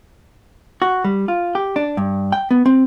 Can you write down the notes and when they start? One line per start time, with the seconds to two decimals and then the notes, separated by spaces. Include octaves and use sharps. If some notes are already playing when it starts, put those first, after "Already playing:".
0.82 F#4
1.04 G3
1.28 F4
1.55 G4
1.76 D4
1.97 G2
2.32 G5
2.51 B3
2.66 C4